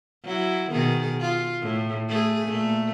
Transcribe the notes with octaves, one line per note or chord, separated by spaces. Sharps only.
F#3 E4
B2 D#3 G#4
F4
A2
A3 G#4
A#2 A3